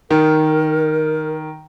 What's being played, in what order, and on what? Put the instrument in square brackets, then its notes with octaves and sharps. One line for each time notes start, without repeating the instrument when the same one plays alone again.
[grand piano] D#3 [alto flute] A#4